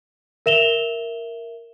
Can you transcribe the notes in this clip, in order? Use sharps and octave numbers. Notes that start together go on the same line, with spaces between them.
A#4 E5 E7 F7 G7